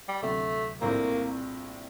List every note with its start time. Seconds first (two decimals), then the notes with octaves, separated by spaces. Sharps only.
0.08 G3
0.22 D2 C3 F#3 A3
0.81 A#1 A2 G3 A#3 C4